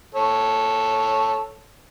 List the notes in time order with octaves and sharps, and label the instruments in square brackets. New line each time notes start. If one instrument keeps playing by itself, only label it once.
[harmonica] A4 C#5